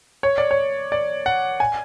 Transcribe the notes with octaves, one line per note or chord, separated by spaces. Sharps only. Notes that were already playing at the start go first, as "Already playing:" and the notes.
C#5
D5
C#5
D5
F#5
G#5